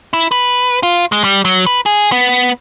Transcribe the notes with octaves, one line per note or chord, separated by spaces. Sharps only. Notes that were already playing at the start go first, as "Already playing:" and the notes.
E4
B4
F4
G#3
G3
F#3
B4
G#4
B3